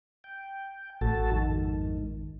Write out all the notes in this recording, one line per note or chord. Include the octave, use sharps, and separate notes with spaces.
G5
A1 F#4 A4 A5
F2 G#2 D#3